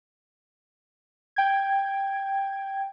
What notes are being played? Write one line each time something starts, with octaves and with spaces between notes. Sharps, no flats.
G5 G#6